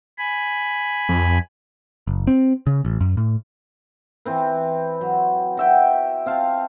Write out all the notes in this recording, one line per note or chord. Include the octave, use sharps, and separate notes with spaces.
G#5 B5
F2
F#1
C4
C#3
A1
F#2
A2
E3 C4 B4
F#3
F#4 E5 G5
C4 F5 A5